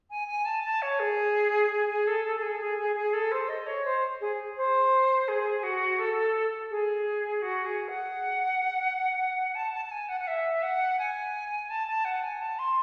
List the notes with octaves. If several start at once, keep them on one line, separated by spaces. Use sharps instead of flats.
G#5
G#5
A5
A5
C#5
G#4
G#4
G#4
A4
A4
A4
G#4
G#4
G#4
G#4
A4
C5
D#5
C#5
C5
G#4
C5
G#4
F#4
A4
G#4
F#4
G#4
F#5
A5
A5
A5
G#5
F#5
F#5
E5
F#5
G#5
A5
A5
F#5
G#5
A5
C6